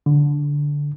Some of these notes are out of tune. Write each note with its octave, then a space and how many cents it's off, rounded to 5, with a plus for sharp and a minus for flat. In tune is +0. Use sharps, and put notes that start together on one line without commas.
D3 -10